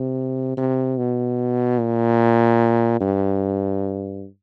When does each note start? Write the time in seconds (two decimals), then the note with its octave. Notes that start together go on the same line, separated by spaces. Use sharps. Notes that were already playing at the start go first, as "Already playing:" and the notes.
Already playing: C3
0.57 C3
0.97 B2
1.78 A#2
3.00 G2